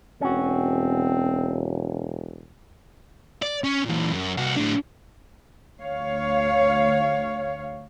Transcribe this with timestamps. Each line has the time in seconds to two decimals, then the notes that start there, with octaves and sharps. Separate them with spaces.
0.21 E1 C4 C#4 F#4
3.42 D5
3.64 C#4
3.85 A#2 E3
4.12 F#2
4.37 C2 F#4
4.56 A2 D4
5.82 D2 C#5 F5